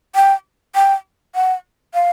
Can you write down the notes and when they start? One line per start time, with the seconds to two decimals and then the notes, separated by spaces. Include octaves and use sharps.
0.15 G5
0.75 G5
1.35 F#5
1.94 F5